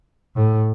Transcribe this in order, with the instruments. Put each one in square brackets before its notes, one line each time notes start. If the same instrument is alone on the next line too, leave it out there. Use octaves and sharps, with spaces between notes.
[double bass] A2